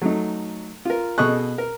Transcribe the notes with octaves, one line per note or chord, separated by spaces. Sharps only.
F#3 A3 D#4
F4 A#4
B2 G#4 A4 D#5 C#6 F#6
A#4